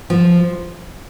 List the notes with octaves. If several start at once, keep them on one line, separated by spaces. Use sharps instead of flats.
F3